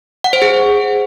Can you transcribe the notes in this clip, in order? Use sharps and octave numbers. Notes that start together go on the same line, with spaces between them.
F#5
C5
G#4